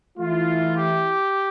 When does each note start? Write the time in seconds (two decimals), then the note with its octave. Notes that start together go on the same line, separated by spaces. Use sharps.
0.18 E3 A3 E4 F4
0.76 G4